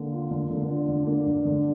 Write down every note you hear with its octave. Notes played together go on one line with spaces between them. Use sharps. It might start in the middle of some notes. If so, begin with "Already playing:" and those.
Already playing: D3 A#3
F4
D3
D3
D4 F4
D3
A#3 D4
G2
D3